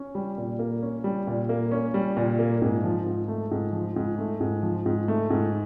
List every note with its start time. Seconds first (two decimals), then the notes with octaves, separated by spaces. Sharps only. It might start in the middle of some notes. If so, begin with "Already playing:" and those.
Already playing: C#4
0.15 G3
0.38 A#2
0.59 A#3
0.83 C#4
1.04 G3
1.27 A#2
1.49 A#3
1.71 C#4
1.94 G3
2.17 A#2
2.39 A#3
2.62 G#2
2.84 F3
3.06 G#2
3.28 A3
3.51 G#2
3.73 F3
3.96 G#2
4.18 A3
4.41 G#2
4.63 F3
4.86 G#2
5.08 A3
5.30 G#2